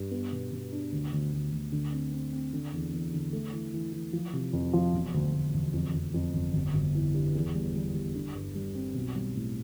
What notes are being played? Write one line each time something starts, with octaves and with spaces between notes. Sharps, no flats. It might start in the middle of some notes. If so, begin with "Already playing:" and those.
Already playing: G2
B3
B2
B2
D4
D2
D2
D2
D2
D3
C4
C4
C4
D3
E2
E2
D3
A3
E3
E3
E3
F3
C3
F2
F3
E1
D2
D2
E1
F2
F2
F2
G1
G1
G1
E3
G2
E2
G3
G3
G3
D3
G2
G3
C4
B1
G3
A2